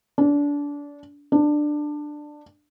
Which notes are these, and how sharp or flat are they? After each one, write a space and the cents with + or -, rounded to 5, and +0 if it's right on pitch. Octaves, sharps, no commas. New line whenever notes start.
D4 -25
D4 +15